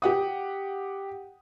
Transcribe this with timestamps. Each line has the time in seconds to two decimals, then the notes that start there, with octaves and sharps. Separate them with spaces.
0.02 G4 F#5 D#6